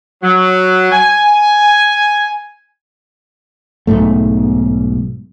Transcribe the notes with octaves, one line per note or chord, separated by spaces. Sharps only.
F#3
G#5
B1 E2 G#2 A3